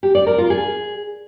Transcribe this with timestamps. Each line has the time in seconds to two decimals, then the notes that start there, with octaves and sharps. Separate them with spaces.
0.03 G4
0.15 D5
0.26 A#4
0.38 F4
0.50 G#4